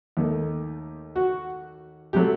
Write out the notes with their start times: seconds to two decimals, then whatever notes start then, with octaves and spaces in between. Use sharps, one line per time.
0.17 D#2 D#3 A3
1.16 F#4
2.13 C3 F#3 A3 G4